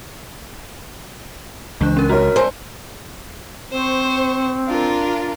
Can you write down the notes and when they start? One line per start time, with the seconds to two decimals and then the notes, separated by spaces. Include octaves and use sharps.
1.81 C#2 E3 D4 F#6
1.97 C#4 A#4
2.09 F#4 A#4 C#5 A#5 F6
2.36 B3 C5 G#5 A5
3.73 C4 C5 C#6
4.68 D4 F4 A#4